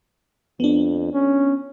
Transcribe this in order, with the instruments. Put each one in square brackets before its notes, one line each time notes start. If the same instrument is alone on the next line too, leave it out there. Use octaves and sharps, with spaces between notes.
[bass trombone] F2 [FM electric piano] B3 D4
[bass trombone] C#4